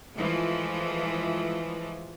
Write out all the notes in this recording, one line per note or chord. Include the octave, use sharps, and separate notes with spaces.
E3 F3 G#3 A3